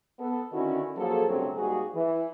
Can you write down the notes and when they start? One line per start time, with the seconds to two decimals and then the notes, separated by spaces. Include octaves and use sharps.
0.19 B3 A4
0.52 D3 D#3 C#4 E4 F#4
0.97 F3 F#3 A#3 G#4 A4
1.28 D2 G2 C#3 F#3 A3 C4
1.57 G#2 G3 A#3 F#4 G#4
1.95 E3